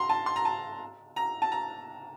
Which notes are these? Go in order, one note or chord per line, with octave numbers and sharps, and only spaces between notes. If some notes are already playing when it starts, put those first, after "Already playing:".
Already playing: A#5 C6
A5
C6
A#5
A5
A#5
A5
A#5